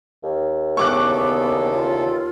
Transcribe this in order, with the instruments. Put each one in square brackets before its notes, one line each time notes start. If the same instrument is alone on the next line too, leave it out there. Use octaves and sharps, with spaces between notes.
[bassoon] D#2
[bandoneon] E2 C#3 A4 [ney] B3 [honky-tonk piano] C#6 D6 F#6
[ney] F4